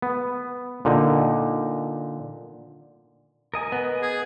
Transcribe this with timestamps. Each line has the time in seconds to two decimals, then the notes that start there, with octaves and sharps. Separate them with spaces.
0.02 B3
0.85 A#2 D3 D#4
3.54 A#4 D#5 G#5
3.72 B3
4.02 G#4